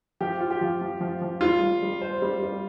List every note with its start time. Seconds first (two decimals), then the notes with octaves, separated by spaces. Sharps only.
0.21 F3 G4
0.40 F4
0.51 G4
0.61 F3
0.81 F3
1.01 F3
1.22 F3
1.41 G3 F4
1.61 G3
1.82 G3
2.01 C5
2.22 G3
2.43 G3